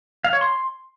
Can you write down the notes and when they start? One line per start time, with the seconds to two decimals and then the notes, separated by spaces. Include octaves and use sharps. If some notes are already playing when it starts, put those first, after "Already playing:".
0.24 F5
0.33 C#5
0.41 C6